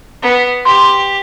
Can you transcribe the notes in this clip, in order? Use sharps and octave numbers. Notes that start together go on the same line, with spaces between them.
B3
G4 C6